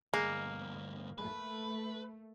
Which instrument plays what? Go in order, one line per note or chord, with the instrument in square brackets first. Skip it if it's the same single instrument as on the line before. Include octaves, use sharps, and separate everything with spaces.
[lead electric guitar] D2 G2 [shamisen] G#3 [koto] A#3
[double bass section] A3 [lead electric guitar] B4